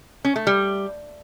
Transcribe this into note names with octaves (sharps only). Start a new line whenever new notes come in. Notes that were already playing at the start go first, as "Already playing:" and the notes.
C#4
A3
G3